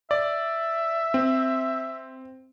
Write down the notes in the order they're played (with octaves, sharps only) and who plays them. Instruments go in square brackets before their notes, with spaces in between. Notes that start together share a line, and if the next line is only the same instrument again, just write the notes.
[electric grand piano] D5 [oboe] E5
[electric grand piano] C4